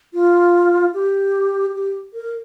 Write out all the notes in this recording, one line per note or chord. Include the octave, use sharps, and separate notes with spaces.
F4
G4
G4
A#4